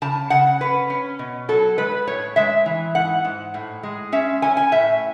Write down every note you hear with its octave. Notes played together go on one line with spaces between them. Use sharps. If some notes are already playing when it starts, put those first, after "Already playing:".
C#3 A5
C#3 F#5
C#4 B4
C#4
B2
F#3 A4
G#3 B4
A2 C#5
G#3 E5
E3
G#2 F#5
G#2
A2
G#3
C#4 E5
C#4 G#5
G#5
A2 E5